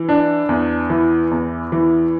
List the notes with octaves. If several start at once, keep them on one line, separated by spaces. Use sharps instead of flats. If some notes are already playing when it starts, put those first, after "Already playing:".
Already playing: E3
D4
E2
E3
E2
E3